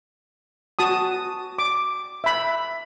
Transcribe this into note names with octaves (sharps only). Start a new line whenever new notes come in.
F#4 A5 D#6
D6
E5 B5